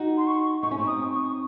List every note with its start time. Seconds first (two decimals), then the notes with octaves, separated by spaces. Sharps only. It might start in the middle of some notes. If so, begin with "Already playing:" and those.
Already playing: D#4 F#4
0.17 C6
0.27 C#6
0.63 D#4 C#6
0.71 C#4
0.78 C4 D#4
0.87 D#6
1.11 C#6